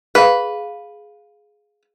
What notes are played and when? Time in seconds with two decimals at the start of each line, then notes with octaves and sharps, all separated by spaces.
0.15 G#4 B4 F5